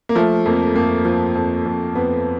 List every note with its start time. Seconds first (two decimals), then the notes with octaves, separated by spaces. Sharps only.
0.09 A#3
0.15 F3 A3
0.46 F2 A#3
0.75 F2 A#3
1.05 F3
1.35 F2
1.66 F2
1.95 F2 B3